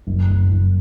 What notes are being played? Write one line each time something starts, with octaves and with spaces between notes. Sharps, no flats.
F#1
F#1
F#1